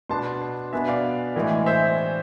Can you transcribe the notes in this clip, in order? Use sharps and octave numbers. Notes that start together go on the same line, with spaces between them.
B2 B3 D4 A5 C6
B2 B3 D4 E5 G#5
D5 F5
A2 E3 G#3
C5 E5